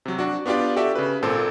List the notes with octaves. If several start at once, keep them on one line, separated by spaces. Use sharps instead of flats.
C3 F#3
D4 F#4
B3 D4 F4 G4 D5
F#4 G4 A4 D5 E5
C#3 B4
G#1 A#2 A4 C5